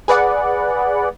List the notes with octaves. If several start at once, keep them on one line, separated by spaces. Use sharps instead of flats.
G#4 B4 D5 F#5